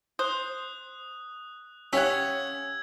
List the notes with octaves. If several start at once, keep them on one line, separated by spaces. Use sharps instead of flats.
C5 D#6 F#6
C#4 G4 F5 F#5 E6 G#6